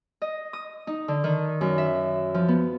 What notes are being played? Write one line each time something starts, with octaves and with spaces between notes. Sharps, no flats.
D#5
D#6
D#4
D3
D#3
F#2
E5
F3
B3